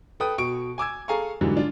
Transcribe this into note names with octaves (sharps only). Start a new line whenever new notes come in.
A4 B4 G5 D#6
B2 C#6 D7
G#5 D6 E6 G#6
G#4 A4 F5 G#5 A#5 C#6
G#2 D3 E3 F#3 G3
D4 F4